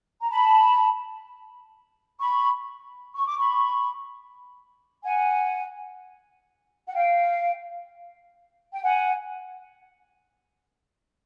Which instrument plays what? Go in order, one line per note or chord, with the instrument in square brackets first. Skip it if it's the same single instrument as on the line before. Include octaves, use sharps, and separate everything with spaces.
[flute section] A#5
A5 B5
B5 C#6
C#6
D6
B5 C#6
F#5 G#5
F#5
F5 G5
G5
F#5 G#5